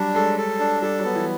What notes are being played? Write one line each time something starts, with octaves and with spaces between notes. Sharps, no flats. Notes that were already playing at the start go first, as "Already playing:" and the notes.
Already playing: F#3 G3 D4
G#3 A4
A4
D4
G3 A4
F#3
B3
E3